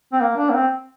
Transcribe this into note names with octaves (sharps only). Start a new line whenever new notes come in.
C4
A#3
D4
A#3
C4